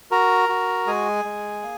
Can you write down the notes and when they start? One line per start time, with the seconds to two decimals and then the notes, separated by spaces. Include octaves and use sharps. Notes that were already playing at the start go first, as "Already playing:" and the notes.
0.11 F#4 A#4 A#5
0.49 F#4
0.87 G#3 G#4 G#5
1.25 G#3
1.62 A#3